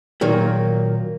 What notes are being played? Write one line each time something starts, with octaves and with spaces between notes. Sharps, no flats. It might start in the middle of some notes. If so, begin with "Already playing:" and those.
A#2 D#3 F#3 A#3